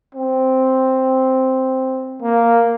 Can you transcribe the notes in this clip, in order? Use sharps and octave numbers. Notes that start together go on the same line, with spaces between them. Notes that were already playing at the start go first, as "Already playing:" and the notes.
C4
A#3